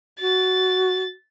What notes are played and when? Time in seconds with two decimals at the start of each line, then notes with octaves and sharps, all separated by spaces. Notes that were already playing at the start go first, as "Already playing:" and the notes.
0.20 F#4 A6